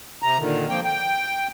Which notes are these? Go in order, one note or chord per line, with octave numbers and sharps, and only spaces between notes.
C3 A#5
A#2 D3 D#3
F3 A#3 C4 G5
G5